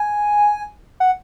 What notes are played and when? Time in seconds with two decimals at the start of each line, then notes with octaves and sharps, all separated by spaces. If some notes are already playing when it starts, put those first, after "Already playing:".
Already playing: G#5
1.00 F#5